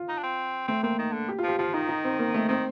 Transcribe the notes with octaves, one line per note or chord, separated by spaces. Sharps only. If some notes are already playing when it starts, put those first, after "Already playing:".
Already playing: F4
D#4
D4
C4
A3 C4
A#3 C4
D#3
D3
G4
F3 F4
G4
F3 F4
D#3 D#4
D#4
C4
A#3
A3
D#3 C4